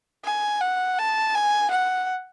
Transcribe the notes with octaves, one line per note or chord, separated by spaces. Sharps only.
G#5
F#5
A5
G#5
F#5